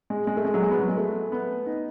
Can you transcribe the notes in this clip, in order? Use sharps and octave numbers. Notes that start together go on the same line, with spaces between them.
G#3
G#3
A3
G#3
F#3
G#3
B3
F#3
G#3
A3
B3
D#4